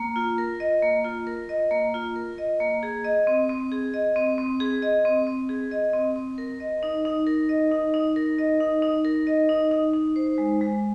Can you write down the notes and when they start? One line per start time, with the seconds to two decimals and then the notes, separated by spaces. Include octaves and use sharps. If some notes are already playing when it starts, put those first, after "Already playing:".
Already playing: A#3
0.16 F4
0.38 A#4
0.60 D#5
0.82 A#3
1.05 F4
1.27 A#4
1.49 D#5
1.71 A#3
1.94 F4
2.16 A#4
2.38 D#5
2.60 A#3
2.83 G#4
3.05 D#5
3.27 C4
3.49 C4
3.72 G#4
3.94 D#5
4.16 C4
4.38 C4
4.60 G#4
4.82 D#5
5.05 C4
5.27 C4
5.49 G#4
5.71 D#5
5.94 C4
6.16 C4
6.38 A#4
6.60 D#5
6.83 D#4
7.05 D#4
7.27 A#4
7.49 D#5
7.71 D#4
7.94 D#4
8.16 A#4
8.38 D#5
8.60 D#4
8.82 D#4
9.05 A#4
9.27 D#5
9.49 D#4
9.71 D#4
9.94 D#4
10.16 C5
10.38 G#3
10.61 G#3